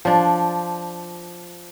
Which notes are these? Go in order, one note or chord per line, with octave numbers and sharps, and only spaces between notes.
F3 D4